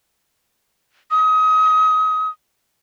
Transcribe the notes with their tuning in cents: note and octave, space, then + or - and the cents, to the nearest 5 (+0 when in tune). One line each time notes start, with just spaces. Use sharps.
D#6 +25